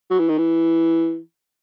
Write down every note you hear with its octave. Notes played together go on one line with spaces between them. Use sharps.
F#3
E3
D#3
E3